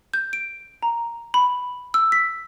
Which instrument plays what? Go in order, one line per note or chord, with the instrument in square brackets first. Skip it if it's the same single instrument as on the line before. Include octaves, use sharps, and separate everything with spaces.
[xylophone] G6
D7
A#5
B5
E6
B6